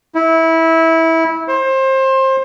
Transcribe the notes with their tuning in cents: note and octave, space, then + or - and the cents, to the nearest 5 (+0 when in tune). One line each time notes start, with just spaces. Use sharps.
E4 -20
C5 +25